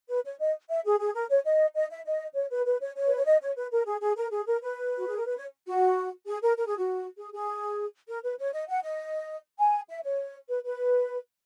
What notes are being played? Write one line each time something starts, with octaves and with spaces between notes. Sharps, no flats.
B4
C#5
D#5
E5
G#4
G#4
A#4
C#5
D#5
D#5
E5
D#5
C#5
B4
B4
C#5
C#5
B4
C#5
D#5
C#5
B4
A#4
G#4
G#4
A#4
G#4
A#4
B4
F#4
G#4
A#4
B4
C#5
F#4
G#4
A#4
A#4
G#4
F#4
G#4
G#4
A#4
B4
C#5
D#5
F#5
D#5
G#5
E5
C#5
B4
B4